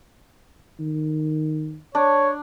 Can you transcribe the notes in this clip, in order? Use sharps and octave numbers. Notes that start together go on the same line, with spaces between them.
D#3
D4 C#5